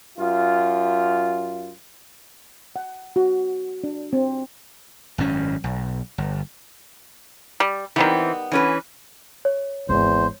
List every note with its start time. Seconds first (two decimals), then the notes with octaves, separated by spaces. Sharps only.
0.17 F#2 F4
2.76 F#5
3.16 F#4
3.84 D4
4.13 C4
5.18 G#1 F#2 C#4
5.64 B1
6.18 G1
7.60 G3
7.96 D#3 E3 G3 B3 C4
8.52 E3 C#4 B4
9.45 C#5
9.89 G#1 E2 C5